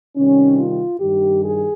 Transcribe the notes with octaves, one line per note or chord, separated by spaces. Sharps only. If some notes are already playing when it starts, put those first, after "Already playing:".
C3 D#3 G3 C#4
F4
G2 D#3 G3 G4
G#4